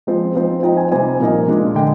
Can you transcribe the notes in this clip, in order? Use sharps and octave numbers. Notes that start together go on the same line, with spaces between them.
F3 G#3 C4
F3 C4 D#4
F3 C4 D#4 G5
G#5
C3 G3 C4 D#4 G#5
A#2 F3 A#3 D#4
A#2 G#3 D4
D3 G#3 G5